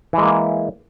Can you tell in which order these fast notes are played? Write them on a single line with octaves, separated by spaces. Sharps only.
E3 G#3 A#3 E4